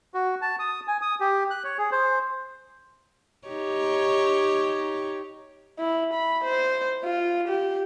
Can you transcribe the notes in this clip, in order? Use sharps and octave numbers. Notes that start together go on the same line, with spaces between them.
F#4
A5
D#6
G#5
D#6
G4
F#6
C#5
G#4
C5
D#4 G4 C#5
E4
B5
C5
F4
G4